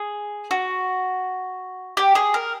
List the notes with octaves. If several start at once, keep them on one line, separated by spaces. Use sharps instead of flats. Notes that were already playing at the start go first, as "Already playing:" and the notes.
Already playing: G#4
F#4
G4
G#4
A#4